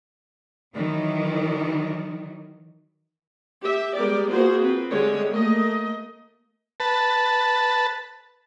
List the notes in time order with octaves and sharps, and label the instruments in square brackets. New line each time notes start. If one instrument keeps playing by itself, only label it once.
[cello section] D#3 E3 F#3
[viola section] G4 E5
G3 G#3 B3 G4 A#4 D5
A#3 B3 F4 F#4 G#4 C5
C4 B4
D3 G3 G#3 C#5
A3 A#3 D#5
[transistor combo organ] B4 A5